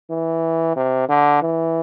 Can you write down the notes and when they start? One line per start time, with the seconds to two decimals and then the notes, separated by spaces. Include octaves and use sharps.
0.10 E3
0.76 C3
1.09 D3
1.42 E3